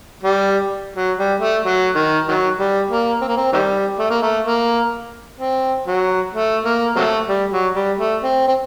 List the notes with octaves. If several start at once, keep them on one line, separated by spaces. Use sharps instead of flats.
G3
F#3
G3
A3
F#3
D#3
D#3 F#3
G3
A#3
C4
A#3
C4
C3 D#3 G3
A3
A#3
A3
A#3
C4
F#3
A3
A#3
C3 F#3 A3
G3
F#3
G3
A3
C4
C4